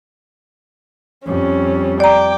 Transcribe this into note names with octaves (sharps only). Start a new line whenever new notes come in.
F2 G3 C#4
D5 G5 A#5 D6